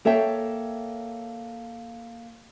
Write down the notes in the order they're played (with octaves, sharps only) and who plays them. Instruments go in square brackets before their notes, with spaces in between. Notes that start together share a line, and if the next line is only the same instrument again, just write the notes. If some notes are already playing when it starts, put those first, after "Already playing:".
[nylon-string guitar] A#3 A4 C#5 E5 G5